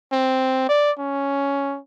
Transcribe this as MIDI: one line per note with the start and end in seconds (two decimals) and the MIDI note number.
0.12 0.66 60
0.69 0.91 74
0.98 1.79 61